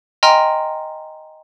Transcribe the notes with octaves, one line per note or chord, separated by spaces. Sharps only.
D#5 G5 G#5 A#5 C6 F6